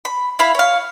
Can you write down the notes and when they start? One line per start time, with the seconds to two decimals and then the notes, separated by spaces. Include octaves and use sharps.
0.05 B5
0.39 E4 F5 B5
0.55 C#5 F5